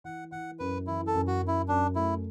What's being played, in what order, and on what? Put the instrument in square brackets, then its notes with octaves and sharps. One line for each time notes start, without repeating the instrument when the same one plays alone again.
[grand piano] E3 [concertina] F#5
[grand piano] E3 [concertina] F#5
[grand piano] F#2 [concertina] B4
[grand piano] E3 [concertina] E4
[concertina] A4
[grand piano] F#2
[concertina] F#4
[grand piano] F#2
[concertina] E4
[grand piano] F#2 [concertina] D4
[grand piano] A3 [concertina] E4